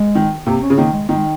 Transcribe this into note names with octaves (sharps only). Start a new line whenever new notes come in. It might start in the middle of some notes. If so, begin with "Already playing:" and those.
Already playing: G#3
D#3
C3 A#3
C#4
C#3
D#3 A#3
G#3
D#3 A#3
G#3